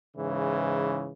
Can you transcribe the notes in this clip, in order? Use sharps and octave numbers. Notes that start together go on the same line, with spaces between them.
G#2 C#3 E3